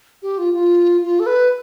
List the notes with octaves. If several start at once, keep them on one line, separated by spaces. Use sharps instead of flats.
G4
F4
F4
F4
A4
B4